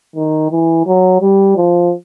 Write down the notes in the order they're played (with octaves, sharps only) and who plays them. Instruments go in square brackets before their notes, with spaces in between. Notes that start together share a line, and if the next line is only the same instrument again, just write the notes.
[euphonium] D#3
E3
F#3
G3
F3